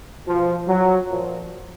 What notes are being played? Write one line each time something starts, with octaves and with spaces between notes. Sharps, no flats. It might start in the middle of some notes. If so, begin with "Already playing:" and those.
B2 F3
F#3
A#2 F3